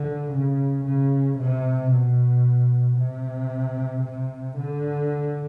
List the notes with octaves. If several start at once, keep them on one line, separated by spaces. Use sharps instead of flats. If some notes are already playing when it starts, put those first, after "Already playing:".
Already playing: D3
C#3
C#3
C3
B2
C3
C3
D3